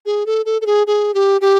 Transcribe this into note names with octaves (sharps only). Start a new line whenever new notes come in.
G#4
A4
A4
A4
G#4
G#4
G4
G4